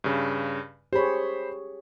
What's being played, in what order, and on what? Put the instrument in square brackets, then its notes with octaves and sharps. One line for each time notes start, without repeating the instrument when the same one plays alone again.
[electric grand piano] G2 C#3
[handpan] G4 G#4 C#5 [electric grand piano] C5 B5